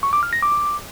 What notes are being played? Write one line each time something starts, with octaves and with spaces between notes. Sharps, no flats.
C#6
D6
F6
A#6
D6